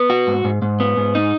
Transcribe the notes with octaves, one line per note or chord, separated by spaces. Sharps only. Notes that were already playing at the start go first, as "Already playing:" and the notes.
Already playing: B3
F#4
G#2
G#2
G#2
B3
G#2
D#4